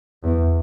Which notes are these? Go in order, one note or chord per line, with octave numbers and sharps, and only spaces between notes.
E2